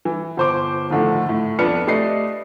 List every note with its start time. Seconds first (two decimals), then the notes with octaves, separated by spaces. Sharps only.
0.05 E3
0.37 G1 C5 D6
0.90 A2 D3 D#3 F3
1.26 A2 A3
1.59 F2 B3 D4 B4 F6 C#7
1.87 A3 G4 B4 D5 D#5 C7